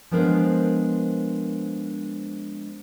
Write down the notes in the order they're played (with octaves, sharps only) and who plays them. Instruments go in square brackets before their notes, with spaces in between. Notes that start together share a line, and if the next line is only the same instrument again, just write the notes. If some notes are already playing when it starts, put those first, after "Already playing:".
[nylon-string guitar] F3 G#3 B3 D4 A#4 C5